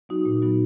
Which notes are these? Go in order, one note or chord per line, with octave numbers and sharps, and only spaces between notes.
F#3 B3 D#4 F#4
A#2
F#3 B3 D#4 F#4